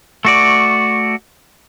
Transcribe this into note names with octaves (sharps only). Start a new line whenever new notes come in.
A3 F#4 D5